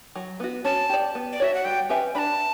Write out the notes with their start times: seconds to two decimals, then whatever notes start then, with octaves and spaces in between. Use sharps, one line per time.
0.15 F#3
0.40 B3 F#4
0.64 C#4 A5
0.89 G4 D5
1.15 B3
1.33 D5
1.40 F#4 C#5 E5
1.54 F#5
1.65 G3 G5
1.89 C#4 G4 B4 E5
2.15 D4 A5 B5